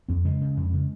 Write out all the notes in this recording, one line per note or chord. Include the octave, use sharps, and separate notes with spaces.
F2 C4
C#3 G#3
C#3
F2
C#3